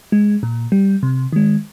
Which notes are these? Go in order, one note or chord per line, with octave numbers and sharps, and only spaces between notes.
G#3
A#2
G3
C3
D#3 G#3